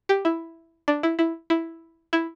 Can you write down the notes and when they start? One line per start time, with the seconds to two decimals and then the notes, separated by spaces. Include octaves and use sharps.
0.09 G4
0.25 E4
0.88 D4
1.03 E4
1.19 E4
1.50 E4
2.13 E4